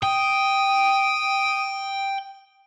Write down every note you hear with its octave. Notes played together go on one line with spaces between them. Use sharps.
G5 D#6